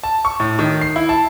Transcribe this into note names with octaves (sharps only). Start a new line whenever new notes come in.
A5
C#6
A2
D#3
C7
E4
A5